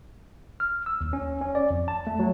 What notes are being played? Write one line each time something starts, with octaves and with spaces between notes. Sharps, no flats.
F6
E6
D#2
C#4
C#4
D5
F2
A5
A3
F#3